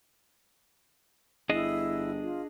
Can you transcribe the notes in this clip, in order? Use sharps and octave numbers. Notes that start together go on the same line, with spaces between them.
G1 D4 E4 G#4 D#5
F4